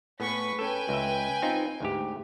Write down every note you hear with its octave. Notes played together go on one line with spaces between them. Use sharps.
A2 B3 G#4 B4 C#6 B6
C#4 A4 B4 G5 G#5
C#2 E5
C4 D#4 F4
D2 G#2 G4